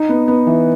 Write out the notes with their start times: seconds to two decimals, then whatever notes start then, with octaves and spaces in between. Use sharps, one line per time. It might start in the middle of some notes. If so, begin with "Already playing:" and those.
Already playing: D#4
0.09 B3
0.28 B3
0.47 E3